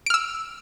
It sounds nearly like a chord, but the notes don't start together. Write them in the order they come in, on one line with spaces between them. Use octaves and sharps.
D7 F6 E6